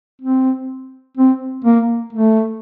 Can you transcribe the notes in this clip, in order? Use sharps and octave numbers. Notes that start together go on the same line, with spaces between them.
C4
C4
A#3
A3